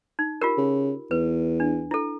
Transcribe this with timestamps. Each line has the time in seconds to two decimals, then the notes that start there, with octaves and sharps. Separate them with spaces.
0.19 D#4
0.41 F4 G4 A#4
0.57 C#3
1.11 E2 B4
1.60 D4
1.91 E4 A4